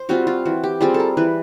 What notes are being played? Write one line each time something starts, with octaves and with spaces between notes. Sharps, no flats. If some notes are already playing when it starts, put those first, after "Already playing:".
Already playing: C5
G3 C4 F4 F#4
F4
E3 F#4
G4
G3 C4 F4 G#4
A4
A#4
E3 B4